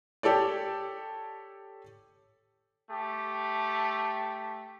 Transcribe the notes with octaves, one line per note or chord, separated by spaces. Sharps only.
G4 A4 C#5 D5
A3 G4